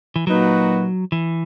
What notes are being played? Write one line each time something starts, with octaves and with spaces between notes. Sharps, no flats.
E3
A#2 F#3 A#3 D#4 F#4 B4
E3